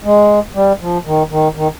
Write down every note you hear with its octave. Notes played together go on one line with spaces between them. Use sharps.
G#3
G3
F3
D#3
D#3
D#3